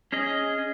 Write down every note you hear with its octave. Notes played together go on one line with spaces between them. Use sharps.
C#4 G#4 D#5